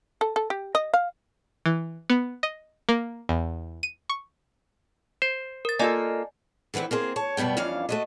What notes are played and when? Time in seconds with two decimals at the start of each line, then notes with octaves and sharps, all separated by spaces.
0.21 A4
0.36 A4
0.50 G4
0.75 D#5
0.94 F5
1.66 E3
2.10 B3
2.43 D#5
2.89 A#3
3.29 E2
3.83 D#7
4.09 C#6
5.22 C5
5.65 A#4 A6
5.79 A#3 F4 A4 D5 D#5 G#5
6.74 D3 E3 B3 C4 E4
6.91 A#3 C4 G#4 C5
7.16 C#5 A5
7.37 F#2 B2 G3 B3 G5
7.57 F2 E3 C#4 D4 F5
7.89 A3 F#4 D#5